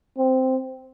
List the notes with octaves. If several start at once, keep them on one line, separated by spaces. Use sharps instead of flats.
C4